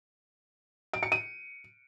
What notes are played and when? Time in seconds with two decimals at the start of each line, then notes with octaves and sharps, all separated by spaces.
0.93 D7
1.03 C#7
1.12 D#7